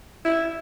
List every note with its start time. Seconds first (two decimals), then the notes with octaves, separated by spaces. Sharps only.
0.25 E4